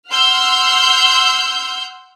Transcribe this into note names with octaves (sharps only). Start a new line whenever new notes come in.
F#5 C6 E6 F6 G6